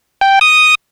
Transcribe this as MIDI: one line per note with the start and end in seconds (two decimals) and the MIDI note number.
0.21 0.39 79
0.41 0.75 87